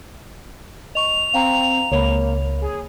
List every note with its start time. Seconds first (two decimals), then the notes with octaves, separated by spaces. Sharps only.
0.95 D#5 C#6 F7
1.34 C4 F5 G5 A#5
1.92 C#2 A#3 C#5 B5
2.61 G#4